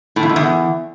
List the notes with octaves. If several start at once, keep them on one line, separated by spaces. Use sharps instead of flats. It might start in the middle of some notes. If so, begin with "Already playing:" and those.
A2
F2
G#2
E2